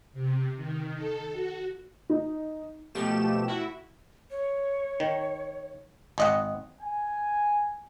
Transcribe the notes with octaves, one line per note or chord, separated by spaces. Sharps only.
C3
D#3
A4
F#4
D#4
B2 F3 A3 G4 E7
E4 F#4 E5
C#5
D#3
G#1 D#5 F#5
G#5